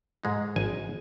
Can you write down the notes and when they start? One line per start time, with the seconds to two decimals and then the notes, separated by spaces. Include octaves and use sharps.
0.23 G#2 G#3 D#4
0.56 G#1 G#5